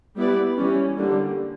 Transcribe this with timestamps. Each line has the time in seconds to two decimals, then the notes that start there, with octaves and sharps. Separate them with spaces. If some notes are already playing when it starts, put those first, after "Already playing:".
0.16 G3 B3 E4 B4 D5
0.58 E3 G3 C#4
0.98 D3 G3 A#3